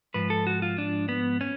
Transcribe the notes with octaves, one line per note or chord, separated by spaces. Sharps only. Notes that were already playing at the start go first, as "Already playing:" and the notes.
G#2 F3 B4
A4
F#4
F4
D4
B3
C#4